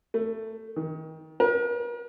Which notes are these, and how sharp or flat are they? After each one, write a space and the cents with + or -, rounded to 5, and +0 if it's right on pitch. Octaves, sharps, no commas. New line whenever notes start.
A3 +10
D#3 +30
A#4 +45